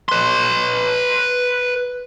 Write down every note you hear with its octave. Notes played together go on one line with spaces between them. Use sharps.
B4 C6